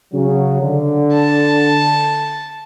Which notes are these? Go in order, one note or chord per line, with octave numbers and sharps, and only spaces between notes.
C#3 F#3
D3
A5